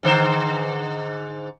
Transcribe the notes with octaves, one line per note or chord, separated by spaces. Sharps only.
G#2 D3 C5